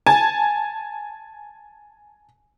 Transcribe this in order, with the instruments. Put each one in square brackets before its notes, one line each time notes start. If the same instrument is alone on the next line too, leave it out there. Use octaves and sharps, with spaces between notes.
[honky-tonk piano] G#5 A5